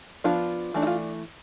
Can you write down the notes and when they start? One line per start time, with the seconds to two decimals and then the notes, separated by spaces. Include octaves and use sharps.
0.24 F3 B3 D4 F4
0.74 E3 A3 D4
0.82 E4
0.87 F4